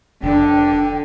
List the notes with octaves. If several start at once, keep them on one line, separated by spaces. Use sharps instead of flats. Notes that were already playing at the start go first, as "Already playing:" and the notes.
F1 D3 D4 G5